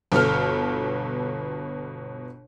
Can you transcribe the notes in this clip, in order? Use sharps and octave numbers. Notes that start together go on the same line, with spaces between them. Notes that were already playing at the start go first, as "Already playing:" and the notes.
G1 B2 A4 F6